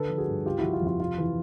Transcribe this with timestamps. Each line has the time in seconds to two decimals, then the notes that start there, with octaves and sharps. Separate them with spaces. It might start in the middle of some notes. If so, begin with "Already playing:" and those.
Already playing: D3 A4 B4
0.10 F3
0.18 F#4 G#4
0.28 G2
0.45 C#3 F4 G4
0.59 F3 E4 F#4
0.73 F4
0.82 F2
0.87 F4
1.00 C3 F4
1.18 E3